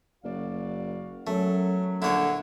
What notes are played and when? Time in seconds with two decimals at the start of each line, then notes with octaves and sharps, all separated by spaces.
0.24 F#1 F#4 D5 F5
1.27 F#2 F#3 A3
2.02 A#1 D3 E4 C#5